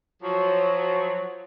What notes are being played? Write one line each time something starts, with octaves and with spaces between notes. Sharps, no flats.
F3 F#3